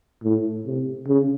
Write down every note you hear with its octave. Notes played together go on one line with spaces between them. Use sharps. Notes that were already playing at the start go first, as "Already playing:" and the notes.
A2
C3
C#3